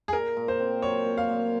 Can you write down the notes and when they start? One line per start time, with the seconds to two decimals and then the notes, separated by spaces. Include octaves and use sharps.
0.08 G#4
0.13 A#2 A#4
0.37 A#2
0.48 C5
0.59 C4
0.82 F#3 C#5
1.06 A#2
1.18 F5
1.29 A#2